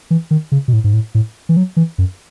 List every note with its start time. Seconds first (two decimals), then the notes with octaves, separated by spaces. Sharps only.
0.11 E3
0.31 D#3
0.52 C#3
0.68 B2
0.73 A2
0.84 G#2
0.93 A2
1.15 A2
1.49 E3
1.57 F#3
1.77 E3
1.98 F#2